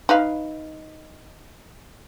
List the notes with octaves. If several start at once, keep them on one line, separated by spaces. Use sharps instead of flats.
D#4 B4 F5